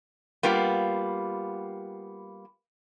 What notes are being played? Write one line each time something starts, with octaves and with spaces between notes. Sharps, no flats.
G3 A#3 B3 F4